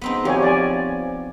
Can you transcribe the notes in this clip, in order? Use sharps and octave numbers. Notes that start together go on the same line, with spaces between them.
B3 C4 D#4
F3 G4 C#5 G#5
D5 G#5